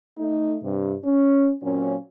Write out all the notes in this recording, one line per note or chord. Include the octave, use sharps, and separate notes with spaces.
A3 D#4
G2 C3
C#4
A#2 F#3 A#3 C4 C#4